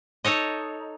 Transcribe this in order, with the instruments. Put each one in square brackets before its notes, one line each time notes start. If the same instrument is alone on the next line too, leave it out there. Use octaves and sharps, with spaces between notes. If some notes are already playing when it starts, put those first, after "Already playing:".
[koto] D#4 A4 C#5 D#5